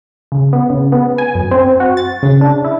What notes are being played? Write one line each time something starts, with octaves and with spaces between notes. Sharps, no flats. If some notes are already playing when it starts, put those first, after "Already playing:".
C#3
B3
C#3
B3
G#5
F#2
C4
F#4
A6
C#3
D4
E4